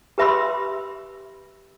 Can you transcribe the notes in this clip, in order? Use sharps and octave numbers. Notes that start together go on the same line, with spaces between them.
G4 B4 E5 B5 C6 E6